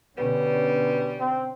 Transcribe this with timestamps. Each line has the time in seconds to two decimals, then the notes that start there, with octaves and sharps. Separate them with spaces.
0.18 B2 D3 G3 B3 C#4
1.20 C4